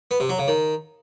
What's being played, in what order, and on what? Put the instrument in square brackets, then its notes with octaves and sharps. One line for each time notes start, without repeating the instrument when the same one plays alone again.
[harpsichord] B3
C3
F#3
C#3
D#3